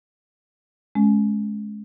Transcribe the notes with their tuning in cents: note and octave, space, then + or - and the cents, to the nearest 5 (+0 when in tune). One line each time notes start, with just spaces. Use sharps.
G#3 +25 C#4 -5